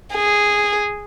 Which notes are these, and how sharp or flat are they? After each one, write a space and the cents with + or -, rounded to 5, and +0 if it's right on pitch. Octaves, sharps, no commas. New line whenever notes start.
G#4 -5